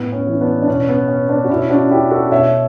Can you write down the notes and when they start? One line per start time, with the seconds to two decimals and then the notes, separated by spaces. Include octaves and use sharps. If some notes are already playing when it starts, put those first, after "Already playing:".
Already playing: A2 B3
0.13 C#4
0.27 E3
0.41 B3 D4
0.63 D4
0.67 B2 C#4
0.89 B3
1.08 C#4
1.29 B3 D4
1.44 F#4
1.49 B2 C#4 E4
1.69 D4 F#4
1.91 E4 G4
2.11 F#4 A4
2.32 B2 C#5 E5